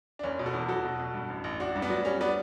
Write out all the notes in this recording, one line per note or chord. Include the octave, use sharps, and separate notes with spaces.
D4
F#1 C#4
B2
F#4 A4
E2
F#3 F#4 A4
B2
B2
G2
A1
A1
A1 D4 F#4
G2
B3 D4
F#3
G3 C#4
G3 B3 D4